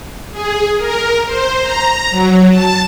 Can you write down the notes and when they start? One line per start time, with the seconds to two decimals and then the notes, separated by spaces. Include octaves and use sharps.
0.31 G#4
0.77 A#4
1.25 C5
1.61 A#5
2.10 F#3
2.50 A5